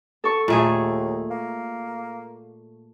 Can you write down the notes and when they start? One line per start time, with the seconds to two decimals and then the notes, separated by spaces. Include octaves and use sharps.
0.24 A4 C#6
0.48 D#2 A#2 A3 G#4
1.31 A#3